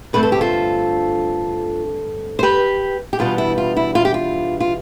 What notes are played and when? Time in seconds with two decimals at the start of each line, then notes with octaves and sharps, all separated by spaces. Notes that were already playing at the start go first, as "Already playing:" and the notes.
0.13 G2 D3 A3 C4 B4
0.23 A4
0.32 G4
0.41 F4 A4
2.39 C5
2.43 G4 B4
3.13 G4
3.19 E2 B2 G3 B3 D4 F4
3.38 E4
3.58 F4
3.76 E4
3.95 F4
4.05 G4
4.14 F4
4.60 F4